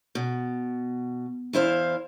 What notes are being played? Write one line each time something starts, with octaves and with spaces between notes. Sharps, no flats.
B2
E2 E4 C5 F5